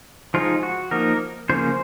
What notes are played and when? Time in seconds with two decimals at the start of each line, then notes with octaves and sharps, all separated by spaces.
0.34 F3 G#3 D#4 F4
0.63 F#4
0.91 F3 A#3 D#4 A#4
1.49 C#3 F3 A#3 C#4 C5